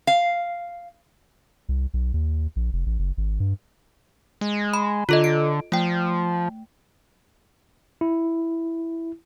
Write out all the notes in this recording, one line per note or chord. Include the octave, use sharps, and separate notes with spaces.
F5
C2
B1
D#2
A#1
F1
A1
F#1
G#1
G2
G#3
B5
D3 F4 A4 D#5
D7
F3 A3 G5
E4